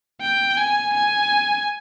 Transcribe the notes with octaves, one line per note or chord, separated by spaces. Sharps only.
G5
G#5
G#5